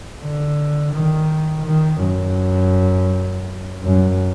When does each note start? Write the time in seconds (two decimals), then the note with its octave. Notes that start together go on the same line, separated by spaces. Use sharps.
0.21 D3
0.93 D#3
1.65 D#3
2.02 F#2
3.83 F#2